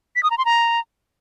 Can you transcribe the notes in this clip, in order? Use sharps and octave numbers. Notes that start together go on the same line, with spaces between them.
B6
D#6
A#5
C6
A#5